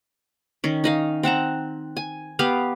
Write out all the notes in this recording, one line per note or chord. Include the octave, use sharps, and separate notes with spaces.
D#3 C#4
D#4 D#5 F5
C4 F#5 A5 A#5
G#5
B3 G4 F5